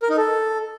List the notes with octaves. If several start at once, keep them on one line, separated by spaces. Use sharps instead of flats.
A#4
D#4
A4